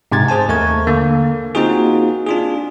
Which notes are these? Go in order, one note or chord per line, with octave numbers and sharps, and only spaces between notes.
G#2 C3 G#3 G#6 A6
G#4 C5 G#5 A5
D#2 A3 A#4 C#6 G#6
D3 A#3
A#3 C4 D#4 F4 F#4 G#4
D4 F4 G#4